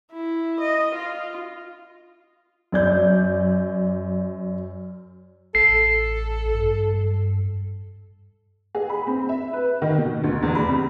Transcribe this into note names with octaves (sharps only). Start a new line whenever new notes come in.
E4
D#5
F4
F#2 D5 G6
A1 A4 C7
G2
G#4
B5
C4
E5
B4
D#3
B2
D2
E2
B5
C3